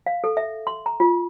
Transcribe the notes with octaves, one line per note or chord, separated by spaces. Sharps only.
F5
A4
E5
C6
A#5
F4